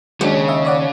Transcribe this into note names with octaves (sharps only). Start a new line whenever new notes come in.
D#2 F#3 G#3 C#4 D4
C#3 G#4
D#5 E5
C#5 D5 F#5